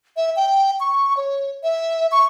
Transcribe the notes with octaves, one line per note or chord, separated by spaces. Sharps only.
E5
G5
C#6
C#5
E5
C#6